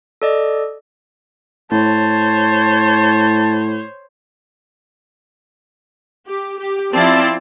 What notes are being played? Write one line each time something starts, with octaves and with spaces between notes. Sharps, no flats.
A4 D5 D#5
A2 C5 C#5 A5
G4
G4
F3 C4 E4 D5 A5 C6